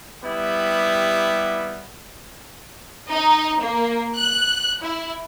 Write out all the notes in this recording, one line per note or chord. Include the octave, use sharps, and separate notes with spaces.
G3 B3 E4 G4
D#4
A#3
F#6
E4